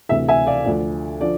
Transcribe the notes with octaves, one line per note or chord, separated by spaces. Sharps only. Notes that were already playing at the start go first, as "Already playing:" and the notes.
D2 C3 E3 E5
E5 G#5
D5 F5
D2 D3 F3 D5
D3 F3 D5